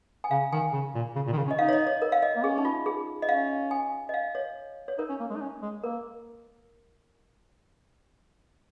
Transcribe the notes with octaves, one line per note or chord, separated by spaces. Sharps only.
G#5
C#3 F5
D#3 G#5
C#3
A#2
C#3
A#2
D#3
C#3
C#4
D#5
D#4 F5
C#5
D#5
C#5
A#4
F5
D#5
A#3
C#4 G#4
D#4
F4
G#4
D#5
C#4 F5
G#5
D#5
F5
C#5
C#5
D#4 A#4
C#4
A#3
G#3
D#4
C#4
G#3
A#3 A#4